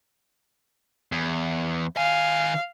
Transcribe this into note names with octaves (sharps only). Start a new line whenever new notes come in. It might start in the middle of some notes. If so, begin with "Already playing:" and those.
E2
D#3 F5 G#5